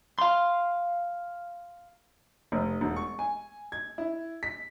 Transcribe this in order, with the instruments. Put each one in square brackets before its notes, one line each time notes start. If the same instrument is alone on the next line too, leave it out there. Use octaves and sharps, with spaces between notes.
[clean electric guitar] F5 C6
[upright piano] F1
E1
C#6
G#5
G#6
E4
B6